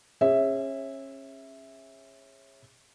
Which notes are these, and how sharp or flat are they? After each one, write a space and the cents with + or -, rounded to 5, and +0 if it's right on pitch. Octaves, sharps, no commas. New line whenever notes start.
C#4 -30 G#4 -25 E5 -5